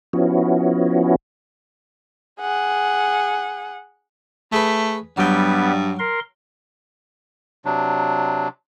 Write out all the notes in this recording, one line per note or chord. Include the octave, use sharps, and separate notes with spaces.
F3 B3 C#4 E4 F#4
G#4 F#5
A3 G#4 B4
G2 F#3 G3 B3 G5
A#4 C6
C3 F#3 D4